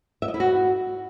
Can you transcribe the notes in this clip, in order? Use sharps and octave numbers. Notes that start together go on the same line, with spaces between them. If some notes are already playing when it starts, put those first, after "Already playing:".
E5
D#5
E4
F#4